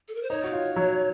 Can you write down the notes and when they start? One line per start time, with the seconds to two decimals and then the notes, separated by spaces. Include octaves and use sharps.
0.08 A4
0.15 A#4
0.23 C5
0.30 D#4 C#5
0.44 F#4
0.53 F4
0.76 F#3